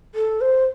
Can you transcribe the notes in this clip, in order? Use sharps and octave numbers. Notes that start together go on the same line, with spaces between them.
A4
C5